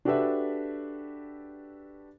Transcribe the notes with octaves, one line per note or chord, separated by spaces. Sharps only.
D4 F#4 G4 A4 B4 E5